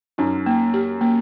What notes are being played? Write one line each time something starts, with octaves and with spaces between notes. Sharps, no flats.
F#2 D#4
A#3
G4
A#3